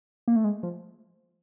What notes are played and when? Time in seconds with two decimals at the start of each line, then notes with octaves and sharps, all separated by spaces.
0.28 A#3
0.36 A3
0.44 G#3
0.63 F3